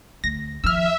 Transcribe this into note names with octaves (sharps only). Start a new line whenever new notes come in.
D2 A#6
D#3 F3 E5 E6 F6